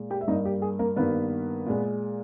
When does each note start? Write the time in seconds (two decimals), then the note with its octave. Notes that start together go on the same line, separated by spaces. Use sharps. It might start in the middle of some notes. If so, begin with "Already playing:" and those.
Already playing: A#2 G#3
0.10 G4 G5
0.21 E5
0.28 G2 G3 A#3 D#4 D#5
0.45 G4
0.62 G#4
0.79 A#3 A#4
0.96 G2 D#3 G3 A#3 B3 B4
1.66 A#2 G#3